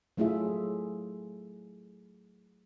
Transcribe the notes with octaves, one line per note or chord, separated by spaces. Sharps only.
F#3 A3 E4 F4 G#4 E5